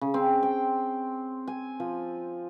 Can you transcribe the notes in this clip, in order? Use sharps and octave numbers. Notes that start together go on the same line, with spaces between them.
C#3
C4
G5
G#5
F3